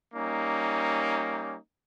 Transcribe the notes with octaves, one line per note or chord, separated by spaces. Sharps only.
G3 A#3 C#4 D#4